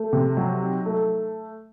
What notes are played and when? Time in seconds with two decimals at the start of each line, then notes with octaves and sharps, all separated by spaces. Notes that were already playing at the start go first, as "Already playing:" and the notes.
Already playing: A3
0.13 C3
0.37 F#3
0.62 D#4
0.86 A3